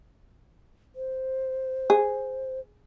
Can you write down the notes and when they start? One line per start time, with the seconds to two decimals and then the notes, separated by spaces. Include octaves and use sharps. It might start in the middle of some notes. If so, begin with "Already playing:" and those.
0.96 C5
1.90 G#4